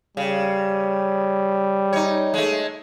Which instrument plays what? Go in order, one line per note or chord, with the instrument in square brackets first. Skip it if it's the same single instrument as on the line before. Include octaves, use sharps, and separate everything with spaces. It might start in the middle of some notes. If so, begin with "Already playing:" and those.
[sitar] C#3 [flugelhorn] G3
[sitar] D#4 C#5
G#3 A3